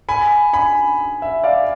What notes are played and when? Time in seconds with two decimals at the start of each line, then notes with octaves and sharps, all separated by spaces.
0.09 G#5 B5
0.53 G#5 B5
1.22 E5
1.44 D5 F5